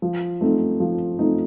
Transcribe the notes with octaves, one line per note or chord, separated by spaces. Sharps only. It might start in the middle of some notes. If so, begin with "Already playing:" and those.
F3
A3 C4 D#4
F3
A3 C4 D#4